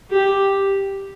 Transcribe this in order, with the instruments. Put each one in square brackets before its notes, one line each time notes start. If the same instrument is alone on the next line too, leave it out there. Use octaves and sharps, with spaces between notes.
[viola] G4